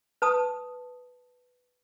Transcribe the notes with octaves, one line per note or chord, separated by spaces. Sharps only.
B4 A5 D#6